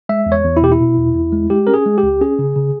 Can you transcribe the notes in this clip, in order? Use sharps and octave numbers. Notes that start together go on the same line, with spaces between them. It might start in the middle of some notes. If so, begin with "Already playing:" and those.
G#3 E5
E2
C#5
E2
E4
B2 G4
E4
B2
E2
E2
G#3
G#3 G4
C#4 A#4
G#4
G#3
G4
C#2
C#4 G#4
C#3
C#3